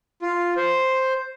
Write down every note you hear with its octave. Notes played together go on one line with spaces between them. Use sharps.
F4
C5